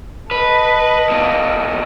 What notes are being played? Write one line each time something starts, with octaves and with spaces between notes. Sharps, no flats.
A4 B4 D#5
E2 A#2